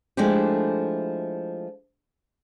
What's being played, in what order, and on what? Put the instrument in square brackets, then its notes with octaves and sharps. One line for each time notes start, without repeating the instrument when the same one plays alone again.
[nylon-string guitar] F3 G#3 A3 D4 E4 G4